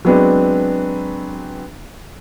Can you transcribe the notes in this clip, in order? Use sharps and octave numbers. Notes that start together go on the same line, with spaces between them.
F#3 G#3 B3 C4 D4